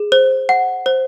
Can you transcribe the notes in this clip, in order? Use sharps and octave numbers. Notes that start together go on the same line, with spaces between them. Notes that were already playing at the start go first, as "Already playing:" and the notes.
Already playing: G#4
C5
F#5
C5